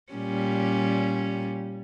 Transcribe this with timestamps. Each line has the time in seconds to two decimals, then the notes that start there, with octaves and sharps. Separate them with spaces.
0.13 A#2 G3 C#4